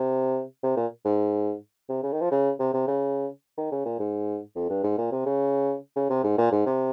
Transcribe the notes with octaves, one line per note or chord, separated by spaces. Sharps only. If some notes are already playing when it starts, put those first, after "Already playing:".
Already playing: C3
C3
A#2
G#2
C3
C#3
D#3
F3
C#3
C3
C3
C#3
D#3
C#3
A#2
G#2
F2
G2
G#2
A#2
C3
C#3
C#3
C3
G#2
A#2
G#2
C3